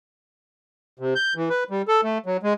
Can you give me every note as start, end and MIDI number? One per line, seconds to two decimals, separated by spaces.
0.99 1.14 48
1.15 1.34 91
1.36 1.49 52
1.49 1.64 71
1.70 1.82 55
1.88 2.01 69
2.03 2.18 57
2.26 2.37 54
2.43 2.53 56